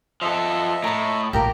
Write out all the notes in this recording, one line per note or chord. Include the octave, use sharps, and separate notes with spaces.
F3 A4 D#5 E5
A2 A5 A#5
A#1 A2 A#3 G4 A#4 A#5